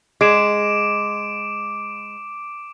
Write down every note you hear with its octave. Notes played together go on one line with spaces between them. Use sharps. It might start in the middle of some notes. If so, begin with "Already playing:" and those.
G#3 D6 D7 E7